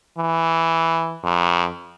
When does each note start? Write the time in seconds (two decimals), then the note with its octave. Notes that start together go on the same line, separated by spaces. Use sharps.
0.19 E3
1.24 F2